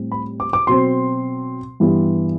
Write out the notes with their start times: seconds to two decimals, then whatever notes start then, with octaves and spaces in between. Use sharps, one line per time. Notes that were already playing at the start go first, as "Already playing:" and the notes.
Already playing: A2 G3 C4
0.12 B5
0.40 D6
0.53 D6
0.67 B2 F#3 C4 C6
1.80 G2 E3 G3 B3